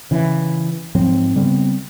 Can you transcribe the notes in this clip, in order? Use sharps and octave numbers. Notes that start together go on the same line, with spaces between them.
C#3 E3
G#2 F3 F#3 C4
C#3 G3 B3 C4